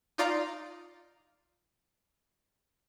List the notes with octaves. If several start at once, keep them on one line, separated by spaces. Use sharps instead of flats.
D#4 F4 D5 F5 A#5